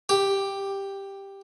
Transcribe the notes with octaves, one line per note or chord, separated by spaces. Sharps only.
G4